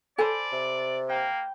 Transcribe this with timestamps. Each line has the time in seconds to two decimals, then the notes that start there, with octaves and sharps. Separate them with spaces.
0.18 A4 C5 D5 G#5 B5
0.52 C3
1.09 A#3 G5